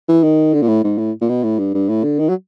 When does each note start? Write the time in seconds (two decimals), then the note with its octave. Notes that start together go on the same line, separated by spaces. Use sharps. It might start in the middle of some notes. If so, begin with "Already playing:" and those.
0.09 E3
0.24 D#3
0.53 D3
0.62 A#2
0.68 A2
0.84 G#2
0.98 A2
1.21 A#2
1.29 B2
1.43 A2
1.59 G2
1.74 G2
1.89 A2
2.03 D3
2.19 D#3
2.29 F#3